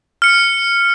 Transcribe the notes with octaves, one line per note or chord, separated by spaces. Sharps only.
F6 C#7